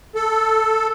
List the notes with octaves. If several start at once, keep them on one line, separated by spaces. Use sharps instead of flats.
A4